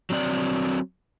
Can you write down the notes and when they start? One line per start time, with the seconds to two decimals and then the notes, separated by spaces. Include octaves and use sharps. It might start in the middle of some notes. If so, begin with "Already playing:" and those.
0.10 F#3 C4 D5